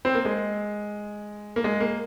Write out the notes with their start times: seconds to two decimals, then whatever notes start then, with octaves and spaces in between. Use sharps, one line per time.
0.05 C4
0.15 A#3
0.25 G#3
1.56 A#3
1.64 G#3
1.80 A#3